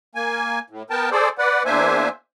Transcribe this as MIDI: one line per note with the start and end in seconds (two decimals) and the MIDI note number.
0.15 0.59 58
0.15 0.59 80
0.70 0.83 45
0.90 1.10 59
0.90 1.10 70
0.90 1.10 79
0.90 1.10 81
1.11 1.29 68
1.11 1.29 69
1.11 1.29 72
1.11 1.29 74
1.38 1.63 71
1.38 1.63 74
1.38 1.63 78
1.65 2.09 40
1.65 2.09 58
1.65 2.09 62
1.65 2.09 72
1.65 2.09 76
1.65 2.09 80